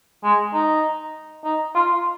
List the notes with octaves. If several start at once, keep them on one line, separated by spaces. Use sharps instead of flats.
G#3
D#4
D#4
F4